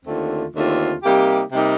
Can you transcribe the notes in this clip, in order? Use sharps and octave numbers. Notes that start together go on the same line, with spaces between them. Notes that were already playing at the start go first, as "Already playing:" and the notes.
D#2 D3 A3 C4 F4
D#2 D3 A3 C4 F4
C3 G3 A#3 D#4 G4
C3 G3 A#3 D#4 G4